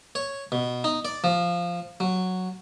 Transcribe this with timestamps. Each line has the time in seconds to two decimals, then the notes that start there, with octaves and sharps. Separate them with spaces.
0.15 C#5
0.52 B2
0.84 D#4
1.05 D5
1.24 F3
2.00 F#3